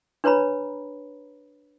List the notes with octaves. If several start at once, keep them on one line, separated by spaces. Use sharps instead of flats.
D4 B4 C#5 A#5 B5